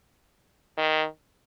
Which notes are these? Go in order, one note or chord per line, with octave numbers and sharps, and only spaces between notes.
D#3